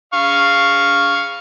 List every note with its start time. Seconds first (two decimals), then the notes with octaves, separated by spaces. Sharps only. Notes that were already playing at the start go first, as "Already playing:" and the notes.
0.14 F5 C#6